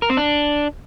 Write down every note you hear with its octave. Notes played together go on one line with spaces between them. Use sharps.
A#4
C4
D4